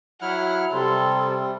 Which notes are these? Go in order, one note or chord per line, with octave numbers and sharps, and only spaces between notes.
F#3 E4 F#5 F6
C3 G3 A4 C6